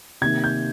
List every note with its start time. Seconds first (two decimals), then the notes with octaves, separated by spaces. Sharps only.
0.21 C3 D#3 A#3 G#6
0.44 G6